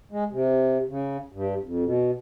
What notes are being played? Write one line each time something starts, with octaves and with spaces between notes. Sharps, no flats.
G#3
C3
C#3
G2
F2
B2